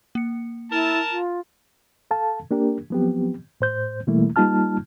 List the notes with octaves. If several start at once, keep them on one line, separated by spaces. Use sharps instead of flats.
A#3 C#7
E4 A#4 A5
F4
A4 F5 A5
A#3 D4 G4 A#4
F3 F#3 B3 C4 G4
A2 C5 G6
B2 E3 G3 A3 A#3 E4
G3 A#3 D#4 F4 A5 F6